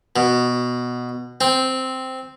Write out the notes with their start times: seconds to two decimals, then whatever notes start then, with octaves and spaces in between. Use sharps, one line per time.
0.16 B2
1.41 C4